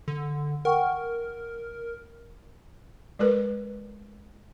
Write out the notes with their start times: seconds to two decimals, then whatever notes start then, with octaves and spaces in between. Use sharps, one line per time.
0.08 D3
0.65 A#4 F#5 G5 C#6
3.19 G#3 A#4 B4